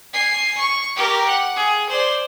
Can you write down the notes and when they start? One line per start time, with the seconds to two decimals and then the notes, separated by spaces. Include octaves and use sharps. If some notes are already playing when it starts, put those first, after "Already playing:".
0.13 G#5 C7
0.58 C#6
0.96 G4 A#4
1.28 F#5
1.56 G#4
1.90 C5 D5